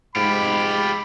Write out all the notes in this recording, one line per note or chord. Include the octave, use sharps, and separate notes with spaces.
G#2 F4 G4 B5